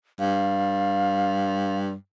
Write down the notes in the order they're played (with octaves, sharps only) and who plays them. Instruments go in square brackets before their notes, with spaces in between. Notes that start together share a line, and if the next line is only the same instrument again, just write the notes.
[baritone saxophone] G2 [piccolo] F5